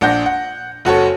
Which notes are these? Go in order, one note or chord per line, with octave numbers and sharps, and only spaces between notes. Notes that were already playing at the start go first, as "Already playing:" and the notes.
A#1 D4 F#5 G6 A#6
F#5
F#1 F#4 A4 C#5